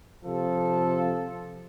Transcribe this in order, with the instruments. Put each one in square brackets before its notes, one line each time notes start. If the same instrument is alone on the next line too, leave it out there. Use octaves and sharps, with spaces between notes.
[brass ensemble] C3 A4 [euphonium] F3